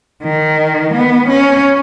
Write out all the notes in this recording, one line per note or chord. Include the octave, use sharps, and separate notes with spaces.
D#3
B3
C#4